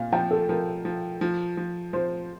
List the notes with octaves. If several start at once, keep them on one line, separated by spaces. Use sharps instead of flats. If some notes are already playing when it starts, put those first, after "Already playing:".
Already playing: A#2 F5
F3 G5
A4
F3 A#4
F3
F3
F3
F3 C5